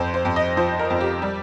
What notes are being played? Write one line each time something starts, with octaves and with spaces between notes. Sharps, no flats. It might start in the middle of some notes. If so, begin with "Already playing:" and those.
Already playing: F2 C5
C5
F2
D#5
F3 C5
A#4
F2
G4
G3